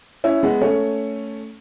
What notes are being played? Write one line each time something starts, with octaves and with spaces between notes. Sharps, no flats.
C#4 E4
G#3 B3
A3 C#4